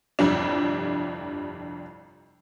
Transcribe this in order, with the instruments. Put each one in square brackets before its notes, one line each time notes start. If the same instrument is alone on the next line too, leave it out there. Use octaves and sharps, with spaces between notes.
[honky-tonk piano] G1 C2 F2 G3 D4